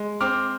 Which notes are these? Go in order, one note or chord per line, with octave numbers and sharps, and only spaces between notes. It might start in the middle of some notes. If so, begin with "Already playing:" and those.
Already playing: G#3
C4 D6 F6